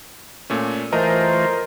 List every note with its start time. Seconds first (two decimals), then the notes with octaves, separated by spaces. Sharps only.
0.50 A#2 A3 C#4
0.93 E3 A3 F4 A#4 C5 D#5 A#5